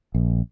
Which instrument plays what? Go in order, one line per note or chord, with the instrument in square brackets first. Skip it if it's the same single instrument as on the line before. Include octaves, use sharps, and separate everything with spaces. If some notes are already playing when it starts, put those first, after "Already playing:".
[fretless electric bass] A#1